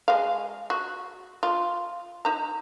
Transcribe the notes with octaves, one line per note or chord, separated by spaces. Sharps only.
G#3 F5
F#4
F4
D#4 A#5